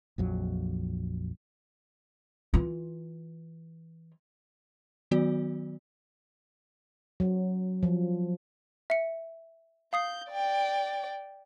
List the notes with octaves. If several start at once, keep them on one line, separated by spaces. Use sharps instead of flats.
A#1 F2 F#3
E3 F4
D#3 F#3 B3 F#4 D5
F#3
F3
E5 C#7
F5 D#6 G6 C7
D5 G5